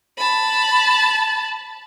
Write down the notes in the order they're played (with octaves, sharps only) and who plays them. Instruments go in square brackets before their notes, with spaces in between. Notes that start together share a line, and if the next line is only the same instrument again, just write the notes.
[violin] A5 B5